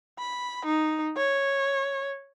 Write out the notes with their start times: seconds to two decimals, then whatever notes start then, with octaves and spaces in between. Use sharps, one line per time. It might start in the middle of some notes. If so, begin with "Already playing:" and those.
0.19 B5
0.65 D#4
1.17 C#5